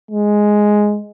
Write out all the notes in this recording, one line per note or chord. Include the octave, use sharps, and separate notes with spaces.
G#3